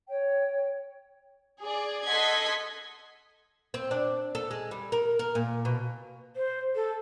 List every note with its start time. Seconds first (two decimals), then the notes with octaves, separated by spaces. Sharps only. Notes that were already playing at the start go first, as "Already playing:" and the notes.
0.08 C#5 G5
1.61 G#4 D5
2.06 A4 D#5 F#5 C6 G#6 B6
3.74 C4
3.91 D4
4.35 A4
4.51 G#3
4.71 G3
4.92 A#4
5.19 A#4
5.35 A#2
5.65 B2
6.36 C5
6.76 A4